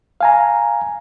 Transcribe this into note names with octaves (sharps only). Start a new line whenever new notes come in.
F5 G#5 A#5